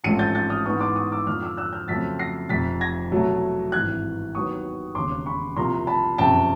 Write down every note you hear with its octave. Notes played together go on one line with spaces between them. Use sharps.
A1 G#2 F3 A3 C4 C#7 D#7
G6 A6
G6 A6
D#6 F6
G#2 E3 G#3 B3 D#4 C#6 D#6
C6 D6
C#6 D#6
D6 E6
F2 D3 F3 D#6 F6
D6 E6
E6 F#6
F6 G6
F2 C#3 F#3 A3 C4 A6 B6
A#6 C7
F1 F2 C3 A6 B6
G#6 A#6
C2 B2 F#3 A3
G#1 G2 E3 F#6 G#6
D#2 D#3 F#3 B3 C#6 D#6
E1 D#2 C#3 C6 D6
B5 C#6
C2 C3 F3 A#3 A#5 C6
A5 B5
F#1 F2 C3 G5 A5